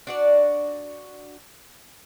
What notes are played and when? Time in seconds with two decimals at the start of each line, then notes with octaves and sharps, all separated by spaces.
0.07 D4 F#4 D5